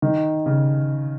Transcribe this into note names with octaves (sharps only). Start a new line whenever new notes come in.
D#3
C#3